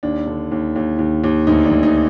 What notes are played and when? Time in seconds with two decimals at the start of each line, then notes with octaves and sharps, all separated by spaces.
0.03 D#2 D4
0.27 D3
0.52 D#2
0.76 D#2
0.99 D#2
1.24 D#2
1.47 D2 D#4
1.65 D4
1.71 D2
1.83 D#4